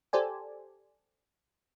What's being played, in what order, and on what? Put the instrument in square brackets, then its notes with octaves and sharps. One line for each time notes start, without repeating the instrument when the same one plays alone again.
[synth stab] G4 A4 C5 D5 G#5